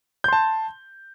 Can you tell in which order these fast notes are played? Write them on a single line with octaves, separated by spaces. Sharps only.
G6 C6 A5